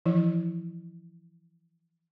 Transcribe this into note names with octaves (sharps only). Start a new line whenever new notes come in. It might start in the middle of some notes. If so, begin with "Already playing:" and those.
E3 F3 E4